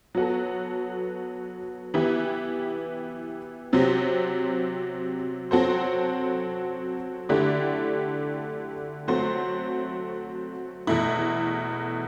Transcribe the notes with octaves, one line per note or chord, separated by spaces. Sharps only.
F#3 B3 F#4 A4
E3 B3 E4 G4
C3 F#3 C4 G4
F#3 C4 F#4 A4 C5
D3 A3 E4 G4 D5
F#3 A3 C4 F#4 C5
E2 B2 A3 E4